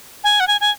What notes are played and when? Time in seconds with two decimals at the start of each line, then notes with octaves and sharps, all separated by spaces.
0.24 G#5
0.40 F#5
0.48 G#5
0.61 G#5